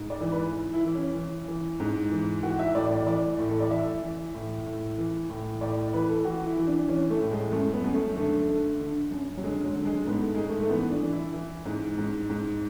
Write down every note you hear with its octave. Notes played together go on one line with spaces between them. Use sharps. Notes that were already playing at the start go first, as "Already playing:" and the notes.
Already playing: G#2
D5
E3
B4
E3
E4
E3
C#4
E3
E3
G#2
E3
E3 F#4
E5
A2 D5
D5
E3 D5
A2
A4
D5
E3 E5
E3
A2
A2
E3
A2
A2 D5
E3 B4
A4
E3 F#4
E4
E3
D4
E3 C#4
A3
A2
G#3
F#2 A3
B3
F#2
A3
D3 A3
D3
D3
F#2
F#3
D3 G#3
F#3
D3
G#3
G#2 B3
A3
G#2 G#3
A3
A3
E3 B3
D4
E3
E4
E3
G#2
G#2
G#2